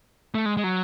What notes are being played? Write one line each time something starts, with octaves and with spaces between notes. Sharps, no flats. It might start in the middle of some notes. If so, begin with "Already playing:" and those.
A3
G#3
G#3
F#3